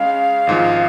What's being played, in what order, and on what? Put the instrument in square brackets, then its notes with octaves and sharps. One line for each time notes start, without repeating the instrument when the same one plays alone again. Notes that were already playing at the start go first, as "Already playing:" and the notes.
Already playing: [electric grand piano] C#3 G#3 [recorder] F5
[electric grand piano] G#1 G#2 F3